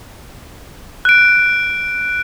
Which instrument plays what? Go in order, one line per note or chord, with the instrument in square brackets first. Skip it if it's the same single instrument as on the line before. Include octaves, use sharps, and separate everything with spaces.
[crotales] F#6 D7